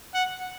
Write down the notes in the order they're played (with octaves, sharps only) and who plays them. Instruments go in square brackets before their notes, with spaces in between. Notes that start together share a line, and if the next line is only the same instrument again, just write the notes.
[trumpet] F#5